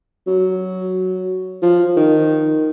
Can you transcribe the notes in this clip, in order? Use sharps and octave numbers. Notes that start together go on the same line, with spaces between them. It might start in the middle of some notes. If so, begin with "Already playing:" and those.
F#3
F3
D#3